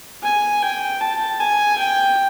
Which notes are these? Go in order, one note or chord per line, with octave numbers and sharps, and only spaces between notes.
G#5
G5
A5
G#5
G5